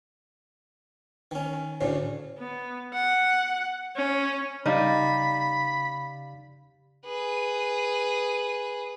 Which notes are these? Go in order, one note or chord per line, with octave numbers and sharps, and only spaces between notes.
D#3 C#4
G#5
D2 A2 C#3 C#5 D5
B3
F#5
C#4
C#3 G3 D#4 F5 B5 A6
G#4 B4